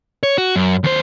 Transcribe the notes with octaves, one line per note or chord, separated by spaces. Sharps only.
C#5
F#4
F#2
D#2 C5